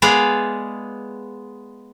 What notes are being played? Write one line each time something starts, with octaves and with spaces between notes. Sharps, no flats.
G#3 B3 G#4 D5 F5